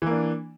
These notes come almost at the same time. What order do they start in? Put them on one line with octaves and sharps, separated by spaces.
E3 A#3 D4